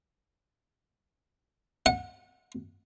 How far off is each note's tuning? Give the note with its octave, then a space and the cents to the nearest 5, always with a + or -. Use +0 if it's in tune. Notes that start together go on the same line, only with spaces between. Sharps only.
F#5 -25